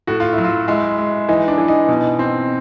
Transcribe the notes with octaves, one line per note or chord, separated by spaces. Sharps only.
A2 F#4
F4
E4
F#3
F4
G#3 E4
G#3
E3 D#4
D4
E3
D#4
B2
C4